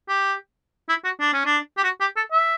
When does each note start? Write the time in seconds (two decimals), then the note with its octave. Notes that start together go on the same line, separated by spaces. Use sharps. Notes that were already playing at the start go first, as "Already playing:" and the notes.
0.09 G4
0.89 E4
1.04 F#4
1.20 D4
1.33 C#4
1.46 D4
1.78 G4
1.84 F#4
2.01 G4
2.17 A4
2.32 E5